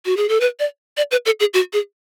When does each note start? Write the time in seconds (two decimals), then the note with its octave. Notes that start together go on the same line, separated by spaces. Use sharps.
0.05 F#4
0.17 G#4
0.29 A4
0.40 B4
0.59 D5
0.97 D5
1.11 B4
1.26 A4
1.40 G#4
1.54 F#4
1.73 G#4